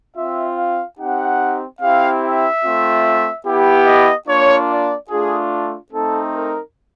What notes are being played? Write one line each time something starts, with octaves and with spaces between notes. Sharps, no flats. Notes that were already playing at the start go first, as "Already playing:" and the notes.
C4 F4 E5
F5
C4 D#4 G4 F#5
C4 E4 G4 F5
E5
A3 C4 F4
B3 E4 G4
D#5
A#3 D4 F4 C#5
D5
A3 D4 F4 G#4
A3 C4 D#4 A4
A#4